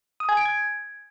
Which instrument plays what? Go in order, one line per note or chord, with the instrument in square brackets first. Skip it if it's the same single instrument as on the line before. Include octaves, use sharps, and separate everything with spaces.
[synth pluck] D#6
G#5
D7
G#6